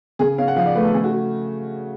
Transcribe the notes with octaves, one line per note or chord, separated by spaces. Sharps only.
C#3 G#4
C#4 F5
F#5
F3 F5
D5
A3 B4
A4
C#3 G#4
F#4